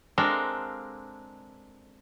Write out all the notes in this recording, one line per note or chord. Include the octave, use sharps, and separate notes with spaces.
G#3 C4 D4 A4 A#4 F5